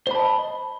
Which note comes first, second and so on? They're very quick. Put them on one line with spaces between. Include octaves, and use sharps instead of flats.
C5 B5 A5 D#5